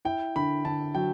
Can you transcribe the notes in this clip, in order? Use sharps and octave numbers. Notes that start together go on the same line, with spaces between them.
E4 G5
D3 B5
D3 A5
F#3 G5